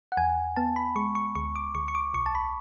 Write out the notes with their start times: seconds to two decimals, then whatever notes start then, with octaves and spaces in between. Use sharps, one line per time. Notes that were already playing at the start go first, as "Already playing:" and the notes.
0.12 F#5
0.17 E2 G#5
0.56 B3 A5
0.76 B5
0.96 G#3 C#6
1.15 C#6
1.35 D2 C#6
1.56 D6
1.75 D2 C#6
1.88 C#6
1.95 D6
2.14 B1 C#6
2.26 A5
2.35 B5